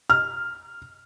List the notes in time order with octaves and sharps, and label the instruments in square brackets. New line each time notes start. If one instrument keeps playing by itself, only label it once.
[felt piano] F6